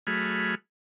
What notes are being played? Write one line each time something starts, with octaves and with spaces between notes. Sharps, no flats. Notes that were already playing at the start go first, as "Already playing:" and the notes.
F#3 A3 G#4 B5 F6